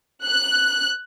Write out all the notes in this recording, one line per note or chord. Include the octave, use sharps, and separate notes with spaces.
F#6